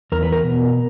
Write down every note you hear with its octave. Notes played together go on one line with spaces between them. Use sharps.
E2 A#4
B4
A#4
B2